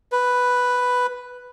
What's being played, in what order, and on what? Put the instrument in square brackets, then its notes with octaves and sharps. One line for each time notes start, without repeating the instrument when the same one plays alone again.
[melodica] B4